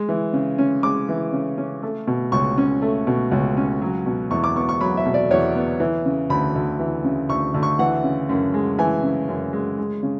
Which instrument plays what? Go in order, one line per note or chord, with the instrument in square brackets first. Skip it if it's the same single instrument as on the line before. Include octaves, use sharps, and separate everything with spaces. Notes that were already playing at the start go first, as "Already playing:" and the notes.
Already playing: [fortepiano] G#3
E3
C#3
C#4
G#3 D6
E3
C#3
C#4
A3
B2
C#2 C#6
C#4
A3
B2
C#2
C#4
F#3
B2
E2 C#6
D6
B3 C#6
C#6
F#3 B5
E5
B2
D5
E2 C#5
B3
E3
C#3
D2 B5
D2
E3
C#3
D2 C#6
D2
C#6
E3 F#5
C#3
F#2
G#3
E3 G#5
C#3
F#2
G#3
G#3
C#3